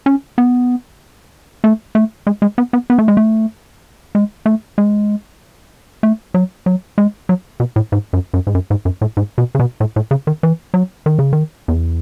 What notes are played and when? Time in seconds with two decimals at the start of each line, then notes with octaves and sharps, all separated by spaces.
0.06 C#4
0.38 B3
1.64 A3
1.95 A3
2.27 G#3
2.42 G#3
2.58 B3
2.73 B3
2.90 B3
2.98 A3
3.08 G#3
3.17 A3
4.15 G#3
4.46 A3
4.78 G#3
6.03 A3
6.34 F#3
6.66 F#3
6.98 G#3
7.29 F#3
7.60 B2
7.76 A2
7.92 G#2
8.13 F#2
8.33 F#2
8.47 G#2
8.55 F#2
8.70 G#2
8.85 F#2
9.01 A2
9.17 G#2
9.38 B2
9.55 C#3
9.59 B2
9.80 A2
9.96 A2
10.11 C#3
10.27 D#3
10.43 E3
10.74 F#3
11.06 D#3
11.19 C#3
11.33 D#3
11.68 E2